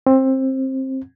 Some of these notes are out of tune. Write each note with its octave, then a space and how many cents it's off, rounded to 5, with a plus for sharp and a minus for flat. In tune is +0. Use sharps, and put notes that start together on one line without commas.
C4 +20